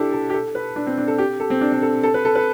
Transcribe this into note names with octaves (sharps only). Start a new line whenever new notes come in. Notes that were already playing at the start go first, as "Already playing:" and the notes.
Already playing: D4 E4 G4 A4
A4
G4
A4
B4
D4
C4
D4
A4
G4
A4
C4
D4
D4
A4
A4
B4
A4
B4